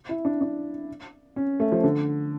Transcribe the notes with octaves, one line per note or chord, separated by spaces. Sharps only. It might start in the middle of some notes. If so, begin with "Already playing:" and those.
E4
D4
D4
C#4
A3
F3
D3